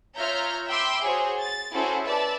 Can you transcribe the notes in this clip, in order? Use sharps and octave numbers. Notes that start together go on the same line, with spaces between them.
F4 C#5 E5 A#5 F6 G6
E5 G5 B5 C6 D6 E6
F#4 G#4 C5 C#5
A6
C#4 E4 F#4 G#4 A4 C5
B4 D5 E5 A5